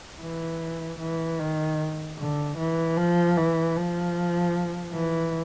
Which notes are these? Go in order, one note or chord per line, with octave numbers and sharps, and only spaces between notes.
E3
E3
D#3
D3
E3
F3
E3
F3
E3